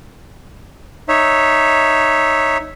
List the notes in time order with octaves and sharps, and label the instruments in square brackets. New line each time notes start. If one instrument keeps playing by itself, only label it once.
[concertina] D#4 C#5 E5